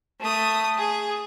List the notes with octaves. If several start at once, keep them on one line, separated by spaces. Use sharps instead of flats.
A3 D#6
G#4